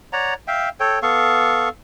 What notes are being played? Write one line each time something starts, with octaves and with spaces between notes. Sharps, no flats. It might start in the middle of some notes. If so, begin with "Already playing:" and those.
C#5 D5 F#5 A#5
E5 F5 G5
A4 C#5 G5
B3 A4 F5 C#6